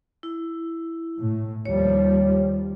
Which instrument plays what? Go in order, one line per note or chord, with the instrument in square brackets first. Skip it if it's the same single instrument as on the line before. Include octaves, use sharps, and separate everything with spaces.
[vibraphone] E4
[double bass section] A2
[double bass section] D#2 F3 G3 [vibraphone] C#5